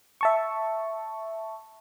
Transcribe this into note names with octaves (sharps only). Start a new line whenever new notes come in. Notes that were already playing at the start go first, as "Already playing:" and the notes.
E5 A5 C#6